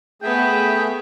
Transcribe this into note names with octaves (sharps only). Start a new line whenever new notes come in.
A3 B3 G#4 E5 G5